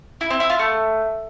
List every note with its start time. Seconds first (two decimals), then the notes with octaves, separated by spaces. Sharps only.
0.21 E4
0.30 C4
0.40 E4
0.50 F4
0.59 A3